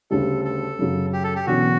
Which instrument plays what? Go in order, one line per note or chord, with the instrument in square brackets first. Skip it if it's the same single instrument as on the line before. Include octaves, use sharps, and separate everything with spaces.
[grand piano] D2 C#3 G3 [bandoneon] A4
[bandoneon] A4
[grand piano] F#2 C#3 F#3
[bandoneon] G4
A4
G4
[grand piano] E1 E2 D3 F#3 C#4 [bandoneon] F#4